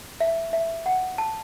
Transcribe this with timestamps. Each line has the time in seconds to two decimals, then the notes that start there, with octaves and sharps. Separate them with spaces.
0.21 E5
0.53 E5
0.86 F#5
1.18 A5